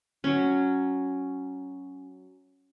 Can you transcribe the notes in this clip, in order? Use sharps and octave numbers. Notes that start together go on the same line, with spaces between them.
F#3 C#4